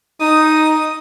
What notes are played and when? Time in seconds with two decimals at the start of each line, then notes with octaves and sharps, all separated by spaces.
0.21 D#4 D#6